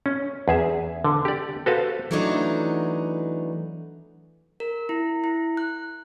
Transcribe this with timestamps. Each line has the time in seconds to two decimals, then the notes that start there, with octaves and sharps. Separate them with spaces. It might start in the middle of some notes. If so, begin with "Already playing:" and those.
0.06 C#4
0.48 E2 G#4 E5
1.04 D3
1.25 G4 D5
1.66 F#4 A4 B4 C5 F5
2.11 E3 F#3 A3 B3 D4 D#4
4.60 A#4
4.89 E4
5.24 E4
5.57 F#6